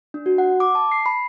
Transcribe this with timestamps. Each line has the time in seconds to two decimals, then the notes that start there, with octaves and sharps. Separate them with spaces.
0.14 D4
0.26 F#4
0.38 F#5
0.60 D6
0.75 A5
0.92 C7
1.06 B5